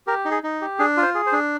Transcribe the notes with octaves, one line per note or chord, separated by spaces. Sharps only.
G4 A#4
D#4
G#4
D#4
G4
D4 G#4
F4
C5
G#4
C5
D4